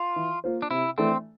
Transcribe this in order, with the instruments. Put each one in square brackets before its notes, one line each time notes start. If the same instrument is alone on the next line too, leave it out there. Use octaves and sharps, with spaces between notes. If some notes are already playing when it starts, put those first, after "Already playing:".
Already playing: [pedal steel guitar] F4
[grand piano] E3
A#3 F4 C5
[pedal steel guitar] D4
[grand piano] C3 [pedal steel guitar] E4
[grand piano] E3 A3 D4 A4 [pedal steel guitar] C4